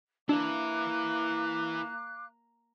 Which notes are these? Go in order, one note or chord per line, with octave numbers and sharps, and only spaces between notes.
A#3 D4 E4 B4 F5 D6 F#6